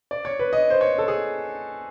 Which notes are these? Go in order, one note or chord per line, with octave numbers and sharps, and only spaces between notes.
D5
C#5
B4
D#5
C5
C#5
A4
G#4